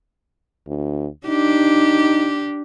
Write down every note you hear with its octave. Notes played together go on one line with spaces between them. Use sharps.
D2
D4 D#4 G4